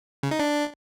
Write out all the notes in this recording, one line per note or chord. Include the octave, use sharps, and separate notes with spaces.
C#3
D#4
D4